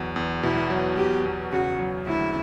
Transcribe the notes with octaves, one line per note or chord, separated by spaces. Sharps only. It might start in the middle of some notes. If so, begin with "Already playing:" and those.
Already playing: E2 B2 F#3
E2
B2 E4
F#3
E2 G4
E2
C#3 F#4
F#3
D2 E4